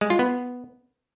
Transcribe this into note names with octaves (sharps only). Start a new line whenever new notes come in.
G#3
F4
B3